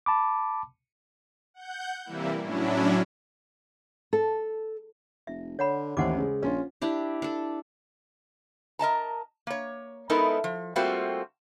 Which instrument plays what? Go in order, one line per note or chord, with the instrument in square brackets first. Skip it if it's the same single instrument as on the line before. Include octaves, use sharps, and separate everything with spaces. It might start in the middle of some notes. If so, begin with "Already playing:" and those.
[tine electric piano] A5 B5 D6
[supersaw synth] F#5 G6
C3 E3 G3 A#3 E4
A2 F#3 C#4 D4 E4
[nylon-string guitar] A4
[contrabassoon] F1 [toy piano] E5
[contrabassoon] D3 [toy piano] C#5 F#5 B5
[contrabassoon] A1 [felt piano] D#2 E3 [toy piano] C5 F#5 D6
[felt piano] C#3 G#3
[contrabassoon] A#1 [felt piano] C#4 F4
[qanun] D4 E4 G4
D4 A4
[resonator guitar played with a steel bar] A#4 D#5 A5 A#5
A#3 C#5
G#3 B3 D#4 E4 A4 A#4
F3
G3 A3 A#3 C4 F4 F#4